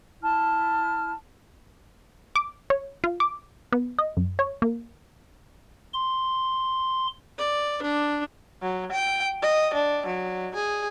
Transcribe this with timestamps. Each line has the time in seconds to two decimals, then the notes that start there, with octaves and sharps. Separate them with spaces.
0.22 E4 A5 F6
2.36 D6
2.70 C#5
3.04 F4
3.20 D6
3.73 B3
3.99 D#5
4.17 F#2
4.39 C#5
4.62 A#3
5.94 C6
7.38 D5
7.82 D4
8.62 F#3
8.92 G5
9.42 D#5
9.74 D4
10.06 F#3
10.55 G#4